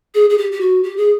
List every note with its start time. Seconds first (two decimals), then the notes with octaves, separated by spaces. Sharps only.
0.15 G#4
0.30 G#4
0.38 G4
0.52 G4
0.61 F#4
0.83 G4
0.97 G#4